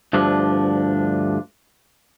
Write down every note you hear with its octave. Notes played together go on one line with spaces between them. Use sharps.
D2 G2 F3 D4